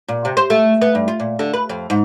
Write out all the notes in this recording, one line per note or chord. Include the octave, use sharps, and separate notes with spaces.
A#2
C3
C5
A3
B3
G2
F4
A#2
D3
B4
F2
G#2